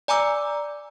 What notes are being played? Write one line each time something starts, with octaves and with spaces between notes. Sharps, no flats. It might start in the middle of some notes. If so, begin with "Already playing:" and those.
D5 G#5 A#5 D6 E6